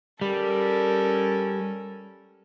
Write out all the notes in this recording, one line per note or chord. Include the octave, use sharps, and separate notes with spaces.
G3 C#4 A4 A#4